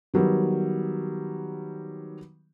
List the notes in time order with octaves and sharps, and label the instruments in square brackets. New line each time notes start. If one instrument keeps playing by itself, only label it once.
[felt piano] D#3 F#3 G3 B3